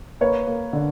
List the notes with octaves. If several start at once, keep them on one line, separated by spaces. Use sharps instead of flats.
A#3 B4 C#5
A#3
D3